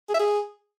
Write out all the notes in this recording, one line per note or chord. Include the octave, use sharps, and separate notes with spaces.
G#4
E5
G#4